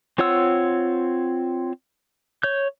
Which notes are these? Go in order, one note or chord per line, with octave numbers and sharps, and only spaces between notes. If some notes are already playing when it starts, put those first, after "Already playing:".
C4 F4 C#5 F#5 E6
C#5 G6